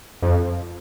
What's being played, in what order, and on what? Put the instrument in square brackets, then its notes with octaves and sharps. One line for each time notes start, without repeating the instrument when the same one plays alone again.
[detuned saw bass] F2